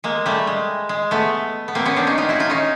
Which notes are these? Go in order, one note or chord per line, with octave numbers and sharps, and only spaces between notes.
G#3 A#3
G3 A3
G#3
G#3
A3 B3
B3
A#3 C4
B3 C#4
C4 D4
C#4 D#4
D#4 F4
E4 F#4
D#4 F4
C#4 D#4